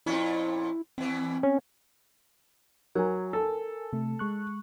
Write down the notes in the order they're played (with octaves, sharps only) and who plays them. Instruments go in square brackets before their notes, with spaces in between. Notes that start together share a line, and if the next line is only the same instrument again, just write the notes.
[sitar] F2 A#2 C#4 [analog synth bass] E4
[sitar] E2 E3 [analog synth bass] C4
[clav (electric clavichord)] C#4
[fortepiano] F#3 [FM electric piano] A#4 G#5
[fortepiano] A4
[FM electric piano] C3 A3
G#3 C#6 F#6